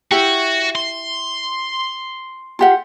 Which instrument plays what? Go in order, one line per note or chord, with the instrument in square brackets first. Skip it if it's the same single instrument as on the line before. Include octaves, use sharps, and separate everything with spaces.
[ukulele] E4 G4 [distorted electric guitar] F#4
[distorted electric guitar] C6
[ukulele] F4 G4 F#5